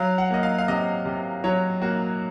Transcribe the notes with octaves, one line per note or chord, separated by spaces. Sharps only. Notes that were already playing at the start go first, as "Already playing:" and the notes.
Already playing: F#3 F5
F#5
A#3 D#5
F5
F5
C3 D#5
C3
F#3 C#5
A#3 F#4